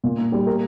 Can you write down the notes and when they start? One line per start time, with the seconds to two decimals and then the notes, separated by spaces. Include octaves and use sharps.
0.04 A#2
0.18 A#3
0.32 G3
0.47 A#4